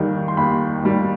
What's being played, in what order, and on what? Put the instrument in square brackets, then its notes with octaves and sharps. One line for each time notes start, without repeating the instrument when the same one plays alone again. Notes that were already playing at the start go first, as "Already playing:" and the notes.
Already playing: [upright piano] D#2 D#3 G3
C6
D#2 B5
D#3 G3